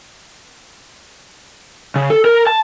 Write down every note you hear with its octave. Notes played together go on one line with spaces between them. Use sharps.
C#3
A4
A#4
A5